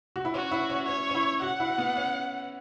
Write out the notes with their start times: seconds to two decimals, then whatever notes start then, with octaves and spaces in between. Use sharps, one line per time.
0.16 F#4
0.25 E4
0.34 C#4 F#4
0.52 E4
0.70 C#4
0.88 C#4 C#5
1.10 C#4
1.15 E4
1.42 F#4 F#5
1.60 E4
1.78 B3
1.96 C#4